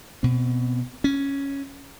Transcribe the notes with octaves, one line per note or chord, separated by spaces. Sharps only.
B2 C4
C#4